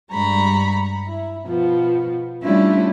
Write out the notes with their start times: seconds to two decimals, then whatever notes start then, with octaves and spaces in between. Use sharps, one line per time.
0.11 G2 G3 G#3 A#5 B5 C#6
1.07 E4
1.46 B2 F3 B3
2.43 G3 A3 C#4 D4 E4 F4